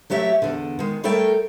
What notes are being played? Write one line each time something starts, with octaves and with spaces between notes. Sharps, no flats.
F#3 A3 G4 C#5 E5
E2 D3
D#3 G#3
G3 A3 A4 A#4 C#5 G5